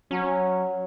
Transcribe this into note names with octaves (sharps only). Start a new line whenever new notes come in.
F#3 C#4